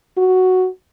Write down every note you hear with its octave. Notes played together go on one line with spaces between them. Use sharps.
F#4